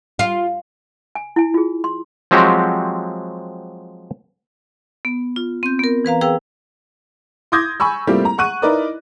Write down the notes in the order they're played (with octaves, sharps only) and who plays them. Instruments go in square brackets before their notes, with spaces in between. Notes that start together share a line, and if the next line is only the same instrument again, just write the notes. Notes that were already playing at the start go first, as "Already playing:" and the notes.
[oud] F4
[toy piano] G#5
E4 G#5
F4 G#4
C6
[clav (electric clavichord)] F3 F#3 G#3 C4 F#4 G4
[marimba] B3
F4
C4 G6
B3 A#4
E3 B4 F5 A#5
G#4 B4 F5 G5 E6
[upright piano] C6 D6 D#6 G6 G#6 A#6
G#5 B5 C#6 E6
G3 A3 A#3 C4 F4 G4
A#5
F#5 C#6 F#6 D#7
D#4 E4 A#4 B4 D5 D#5